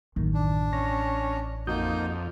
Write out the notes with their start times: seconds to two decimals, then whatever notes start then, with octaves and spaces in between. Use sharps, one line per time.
0.16 A1 F#2 D#3
0.34 D4
0.73 C#4 A#6
1.67 F2 A#3 D#4 F#4 D#6 G6